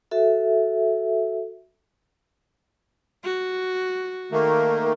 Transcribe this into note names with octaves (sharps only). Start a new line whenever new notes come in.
F#4 A4 E5
F#4
D#3 A3 A#3 A#4